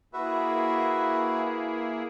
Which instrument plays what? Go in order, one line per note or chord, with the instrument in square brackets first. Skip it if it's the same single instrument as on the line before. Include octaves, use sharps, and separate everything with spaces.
[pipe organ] A#3 E4 G#4 [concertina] F#4 B4 E5